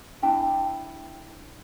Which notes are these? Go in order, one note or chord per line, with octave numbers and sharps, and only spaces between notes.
D4 E4 G5 A5